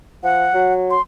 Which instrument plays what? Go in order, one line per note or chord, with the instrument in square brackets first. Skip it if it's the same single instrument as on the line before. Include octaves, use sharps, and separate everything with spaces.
[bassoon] F3 [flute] F#5
[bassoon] F#3
[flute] C6